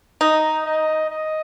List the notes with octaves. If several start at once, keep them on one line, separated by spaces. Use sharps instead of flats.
D#4 D#5
D#5
D#5